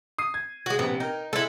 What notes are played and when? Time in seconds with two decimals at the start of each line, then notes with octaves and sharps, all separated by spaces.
0.18 D#6 C7 D#7
0.34 G#6
0.66 G#3 F#4
0.79 A#1 C3 B3
1.00 D#4 A#4 G5
1.33 G#3 E4 A4